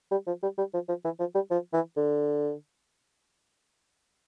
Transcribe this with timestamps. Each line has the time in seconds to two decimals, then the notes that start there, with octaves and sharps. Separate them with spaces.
0.11 G3
0.27 F3
0.43 G3
0.58 G3
0.74 F3
0.88 F3
1.04 E3
1.19 F3
1.35 G3
1.51 F3
1.73 E3
1.97 D3